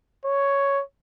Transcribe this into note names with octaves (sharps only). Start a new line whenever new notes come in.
C#5